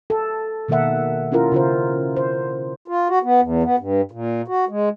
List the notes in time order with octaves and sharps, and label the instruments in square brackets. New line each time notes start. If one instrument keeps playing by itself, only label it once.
[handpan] A4
B2 D#3 A#3 A#4 E5 F#5
C#4 E4 F4 A#4
C#3 F4 C5
C5
[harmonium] F4
F#4
B3
E2
B3
G2
A#2
F#4
G#3